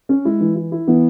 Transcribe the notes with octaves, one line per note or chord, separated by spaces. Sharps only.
C#4
G#3 E4
E3
E4
E4
E3 B3